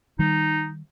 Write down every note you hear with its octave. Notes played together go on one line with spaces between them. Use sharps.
D#3 G3 D#4